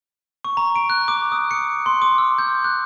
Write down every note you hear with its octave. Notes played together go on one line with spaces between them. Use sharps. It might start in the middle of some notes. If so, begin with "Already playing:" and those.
C#6
A#5
D7
F#6
D6
D#6
C#7
C6
D6
E6
G6
F#6